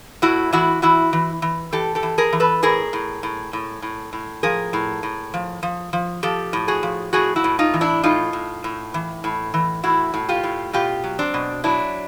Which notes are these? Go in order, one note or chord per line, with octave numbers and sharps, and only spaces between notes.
A2 E4 F#4
E3 E4 F#4
E3 E4 F#4
E3
E3
E3 G4 A4
G4 A4
E3
G#4 A#4
E3
A4 B4
A2 G#4 A#4
A2
A2
A2
A2
A2
F3 G#4 A#4
A2
A2
F3
F3
F3
F3 G4 A4
A2
F#4 G#4
F3
A2 F#4 G#4
E4 F#4
A2
D#4 F4
E3
D4 E4
A2 D#4 F4
A2
A2
E3
A2
E3
A2 E4 F#4
A2
F4 G4
A2
B2 F4 G4
F#3
C4 D4
B2
F#3 D4 E4